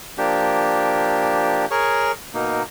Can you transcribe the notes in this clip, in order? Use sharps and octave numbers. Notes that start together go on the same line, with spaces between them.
F3 A#3 D4 G4
G#4 A#4 C#5 C#6
B2 A#3 D#4